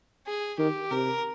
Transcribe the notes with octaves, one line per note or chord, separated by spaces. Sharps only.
G#4
D#3 G4
C3 A#4